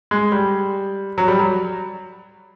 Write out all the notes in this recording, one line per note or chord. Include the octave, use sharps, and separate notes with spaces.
G#3
G3
F#3
G3
F#3